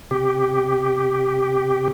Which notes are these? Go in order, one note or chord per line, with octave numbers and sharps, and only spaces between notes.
C3 G4